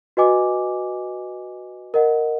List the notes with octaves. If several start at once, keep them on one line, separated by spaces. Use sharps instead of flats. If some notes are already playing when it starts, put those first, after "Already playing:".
F#4 B4 D#5 G#5 D6
A#4 D#5 F#5